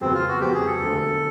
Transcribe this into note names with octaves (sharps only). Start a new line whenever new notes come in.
F2 C#3 F#3 B3 C4
F4
F#4
F2 C#3 F#3 B3 G4
G#4
A4
E1 D2 D3